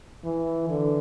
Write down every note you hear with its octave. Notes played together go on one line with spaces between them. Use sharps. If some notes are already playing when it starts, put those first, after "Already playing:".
E3
D3